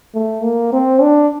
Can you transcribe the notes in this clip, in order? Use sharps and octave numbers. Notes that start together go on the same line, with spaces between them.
A3
A#3
C4
D4